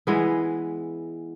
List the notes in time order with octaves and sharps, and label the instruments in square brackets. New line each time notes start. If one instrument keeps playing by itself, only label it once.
[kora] E3 G#3 B3